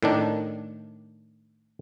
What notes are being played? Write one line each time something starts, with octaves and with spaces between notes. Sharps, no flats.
A2 D#3 D4